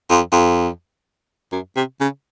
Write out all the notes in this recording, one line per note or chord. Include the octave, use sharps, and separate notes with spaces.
F2
F2
F#2
C3
C#3